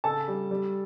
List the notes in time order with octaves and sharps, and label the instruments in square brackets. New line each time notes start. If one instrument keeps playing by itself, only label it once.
[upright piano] C#3 A4 A5
G3
G3